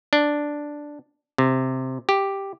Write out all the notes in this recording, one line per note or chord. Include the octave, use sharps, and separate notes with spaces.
D4
C3
G4